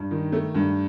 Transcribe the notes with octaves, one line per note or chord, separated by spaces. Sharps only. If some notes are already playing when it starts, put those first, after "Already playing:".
Already playing: G2
D#3
A3
G2